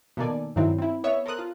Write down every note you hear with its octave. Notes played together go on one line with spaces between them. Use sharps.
B2 D#3 A#3 A4 D5 G#5
G2 D#3 F#3 C4 E4
C4 E4
B3 C#5 E5
A4 A#4 C5 D#6 F#6
F4